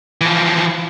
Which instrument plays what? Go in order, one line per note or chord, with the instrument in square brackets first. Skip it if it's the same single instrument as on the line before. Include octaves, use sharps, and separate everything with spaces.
[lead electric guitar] E3 F3